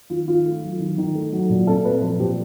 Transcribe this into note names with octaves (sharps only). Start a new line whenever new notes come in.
D#3 F4
D#3 F4
A3
F#3
D#3
D#3
A3
F#3
A#2
C4 A4
A3 B4
F3 C5
A#2 G4